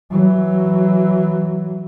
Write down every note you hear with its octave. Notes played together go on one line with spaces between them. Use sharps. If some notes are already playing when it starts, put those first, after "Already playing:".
E3 F#3